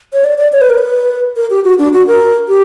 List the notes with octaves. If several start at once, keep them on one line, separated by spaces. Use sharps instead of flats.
C#5
D5
D5
C#5
B4
A#4
B4
A#4
G4
F#4
D4
F#4
A#4
G4